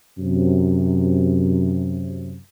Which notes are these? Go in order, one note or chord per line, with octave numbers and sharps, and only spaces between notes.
F#2 C3